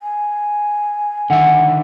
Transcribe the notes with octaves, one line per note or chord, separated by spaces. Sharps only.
G#5
D3 D#3 E5 F#5